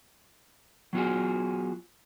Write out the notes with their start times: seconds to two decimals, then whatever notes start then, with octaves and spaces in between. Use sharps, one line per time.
0.93 F#3 B3 F4 F#4 G#4